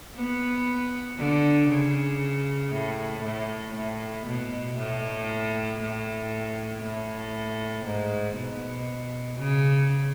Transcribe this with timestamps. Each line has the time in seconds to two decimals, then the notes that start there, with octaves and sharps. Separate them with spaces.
0.16 B3
1.18 D3
1.69 C#3
2.72 A2
3.24 A2
3.75 A2
4.26 B2
4.77 A2
5.79 A2
6.82 A2
7.86 G#2
8.36 B2
9.39 C#3